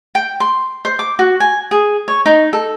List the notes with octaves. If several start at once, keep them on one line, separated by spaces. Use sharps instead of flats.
G5
C6
C5
D6
F#4
G#5
G#4
C#5
D#4
A4